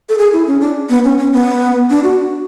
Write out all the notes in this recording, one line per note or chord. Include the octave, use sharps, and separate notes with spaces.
A4
G#4
E4
C#4
D4
B3
C#4
C#4
B3
D4
F#4